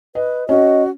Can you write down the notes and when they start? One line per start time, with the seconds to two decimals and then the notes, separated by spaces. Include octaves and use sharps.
0.15 B4 D#5
0.49 C#4 F#4 D#5